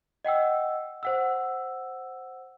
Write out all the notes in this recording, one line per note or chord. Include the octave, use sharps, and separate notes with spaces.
D#5 F#5 G5 E6
C5 F#5 E6